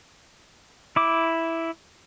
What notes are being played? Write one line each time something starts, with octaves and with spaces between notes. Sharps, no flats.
E4 D6